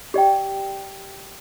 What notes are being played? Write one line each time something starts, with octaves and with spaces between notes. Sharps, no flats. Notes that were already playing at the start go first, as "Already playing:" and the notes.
G4 D5 G5